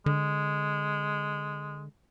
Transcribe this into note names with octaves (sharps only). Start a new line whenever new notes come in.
D3 G#3